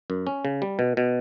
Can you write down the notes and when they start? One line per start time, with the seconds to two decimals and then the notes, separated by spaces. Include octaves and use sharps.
0.10 F#2
0.27 C#4
0.45 C#3
0.62 G3
0.79 B2
0.97 B2